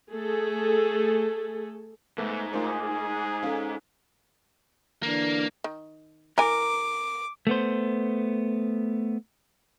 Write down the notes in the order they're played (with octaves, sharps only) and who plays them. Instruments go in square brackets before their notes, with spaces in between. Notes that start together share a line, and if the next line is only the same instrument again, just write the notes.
[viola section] A3 G#4 A4
[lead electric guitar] G#2 [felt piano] A3 B3
[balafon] A3 A#4 C5 [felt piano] D#4 F4 [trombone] G#4
[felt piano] C#4 [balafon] A4 F5
[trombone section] D3 E3 D4 [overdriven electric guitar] A#3
[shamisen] D#3
[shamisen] E3 G#5 [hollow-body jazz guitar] A#4 [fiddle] D6
[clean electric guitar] A3 B3 C5